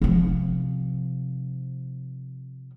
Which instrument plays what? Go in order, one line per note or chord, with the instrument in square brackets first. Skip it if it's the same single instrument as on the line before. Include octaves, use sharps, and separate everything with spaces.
[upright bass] C3 F3